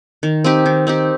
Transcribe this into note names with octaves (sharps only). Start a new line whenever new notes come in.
D#3
C4 D#4 G4
D#3
C4 D#4 G4